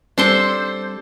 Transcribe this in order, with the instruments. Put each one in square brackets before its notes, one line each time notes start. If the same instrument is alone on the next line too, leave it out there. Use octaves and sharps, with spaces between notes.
[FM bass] G3 [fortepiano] C4 [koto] D4 A4 C5